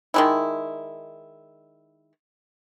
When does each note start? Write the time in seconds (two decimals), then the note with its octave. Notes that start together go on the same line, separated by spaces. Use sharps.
0.14 D#3 G#3 E4